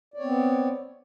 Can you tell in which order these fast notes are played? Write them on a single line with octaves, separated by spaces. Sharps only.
D5 C#5 C4 B3